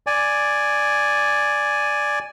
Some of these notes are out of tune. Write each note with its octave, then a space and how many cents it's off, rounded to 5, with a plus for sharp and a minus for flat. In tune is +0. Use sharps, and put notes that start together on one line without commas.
D5 +0 G#5 +0